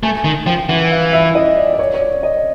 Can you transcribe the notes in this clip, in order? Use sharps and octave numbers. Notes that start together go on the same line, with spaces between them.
A3 G#5
D#3
F3 G5
E3 F#5
F5
E5
D#5
D5
D5
C#5
C#5
D5
D#5